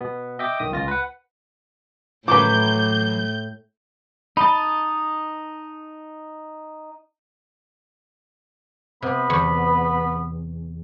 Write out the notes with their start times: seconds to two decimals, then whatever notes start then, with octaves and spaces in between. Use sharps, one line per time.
0.01 B2 B3
0.39 D#5 E5 G5 D6
0.60 B1 D#3 D#6
0.72 C#2 F4 A#6
0.88 B4 F#5
2.28 A2 E3 F#3 B4 D6 G6
4.37 D#4 D#5 A5 B5
9.02 C3 B3 B5
9.30 E2